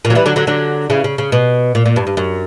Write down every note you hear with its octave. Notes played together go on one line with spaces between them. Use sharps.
A#2
F#3
E3 G3
D3 F#3
D3 F#3
D3 F#3
C#3 E3
C#3
C#3
B2
A#2
A#2
G2
G2
F#2